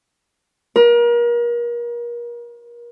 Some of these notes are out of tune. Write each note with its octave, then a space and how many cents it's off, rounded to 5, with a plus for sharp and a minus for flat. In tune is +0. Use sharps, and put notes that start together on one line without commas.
A#4 +35